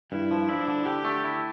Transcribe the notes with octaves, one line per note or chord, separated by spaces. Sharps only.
G2 E4
F3
D4 E4
D3
D3 G4
A3
E4